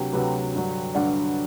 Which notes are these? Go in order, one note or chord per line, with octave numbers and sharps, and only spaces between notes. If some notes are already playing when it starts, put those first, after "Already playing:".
Already playing: D2 C3 F#3 G4 B4
D2 C3 F#3 G4 B4
G2 D3 F#3
G2 D3 F#3 D5 F#5